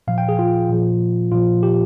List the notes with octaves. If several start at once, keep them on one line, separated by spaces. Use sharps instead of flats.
A#2 F3 F5
G5
G#4
F4
A#2 F3
A#2 F3 F4
G4